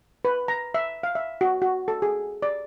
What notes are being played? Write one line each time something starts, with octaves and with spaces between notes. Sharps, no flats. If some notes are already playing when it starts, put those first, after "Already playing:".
B4
A#5
E5
F5
E5
F#4
F#4
A4
G#4
D5